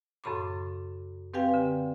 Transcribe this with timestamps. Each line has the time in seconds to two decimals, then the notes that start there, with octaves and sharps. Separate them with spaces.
0.24 F#2 A2 C#3 B5 C6 D6
1.34 C4 G4 B4 F5 G5 G#5
1.54 D3